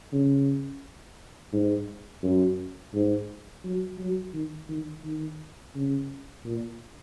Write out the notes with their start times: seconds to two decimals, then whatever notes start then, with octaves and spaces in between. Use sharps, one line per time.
0.12 C#3
1.53 G#2
2.23 F#2
2.94 G#2
3.64 F#3
3.99 F#3
4.34 D#3
4.69 D#3
5.04 D#3
5.75 C#3
6.45 A#2